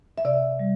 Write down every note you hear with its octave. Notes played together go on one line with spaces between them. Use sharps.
E5
C3 D5
G3